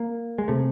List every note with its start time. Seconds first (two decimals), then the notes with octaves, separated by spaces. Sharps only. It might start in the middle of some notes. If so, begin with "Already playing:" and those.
Already playing: A#3
0.38 G#3
0.48 C3 A3